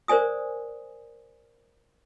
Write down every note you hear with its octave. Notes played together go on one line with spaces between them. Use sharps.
A#4 C5 D5 G#5 D#6